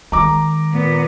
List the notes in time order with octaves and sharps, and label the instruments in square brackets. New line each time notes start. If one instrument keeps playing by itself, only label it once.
[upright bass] D#3 G#3 [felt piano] A#5 D6
[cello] A#2 B3